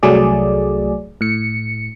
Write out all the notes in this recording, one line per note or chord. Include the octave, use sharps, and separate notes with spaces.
C2 F#3 A3 G#4 D5
A2 C#7